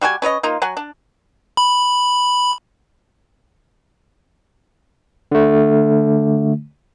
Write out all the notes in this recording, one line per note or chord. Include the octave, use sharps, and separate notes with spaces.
G3 F#4 G4 G#5
C#4 B4 C#5 D#5
A#3 D#4 F4
F#3 F#5 G#5
D4
B5
D3 A3